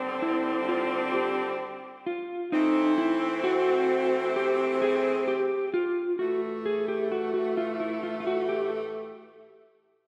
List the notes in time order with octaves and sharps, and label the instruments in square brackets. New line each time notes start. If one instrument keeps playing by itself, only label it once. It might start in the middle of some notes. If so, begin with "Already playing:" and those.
Already playing: [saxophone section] D#2 D3 G3 C4
[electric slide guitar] E4
F4
G4
F4
[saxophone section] E3 A3 C4 [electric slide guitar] D#4
[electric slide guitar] E4
F#4
G4
G#4
G4
F4
[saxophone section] A2 E3 A3 [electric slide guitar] F#4
[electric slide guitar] G#4
G4
F#4
F#4
F4
E4
F4
F4
F#4
G4